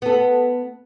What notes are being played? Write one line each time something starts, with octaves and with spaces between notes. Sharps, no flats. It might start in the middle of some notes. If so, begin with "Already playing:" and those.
B3 A4